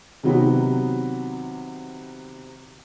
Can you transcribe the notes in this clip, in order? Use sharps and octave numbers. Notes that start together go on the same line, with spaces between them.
C3 D#3 F#3 B3